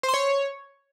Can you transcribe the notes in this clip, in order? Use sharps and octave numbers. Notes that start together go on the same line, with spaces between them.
C5
C6
C#5